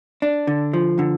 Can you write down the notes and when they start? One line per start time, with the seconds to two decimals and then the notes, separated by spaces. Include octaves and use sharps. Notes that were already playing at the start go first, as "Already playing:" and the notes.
0.22 D4
0.47 D3
0.73 F3
0.99 D3